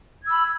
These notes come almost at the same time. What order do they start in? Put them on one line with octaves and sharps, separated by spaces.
G#6 E6 B5